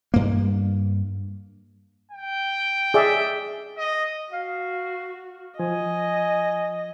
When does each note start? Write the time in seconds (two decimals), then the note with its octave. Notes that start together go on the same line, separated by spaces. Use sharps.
0.14 G2 A#3
2.11 G5
2.94 G#4 D5 E5
3.78 D#5
4.33 F#4 F5
5.60 F3 D#5 G#5